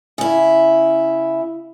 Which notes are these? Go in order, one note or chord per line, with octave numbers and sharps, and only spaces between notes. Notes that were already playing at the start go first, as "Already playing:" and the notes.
C#3 E4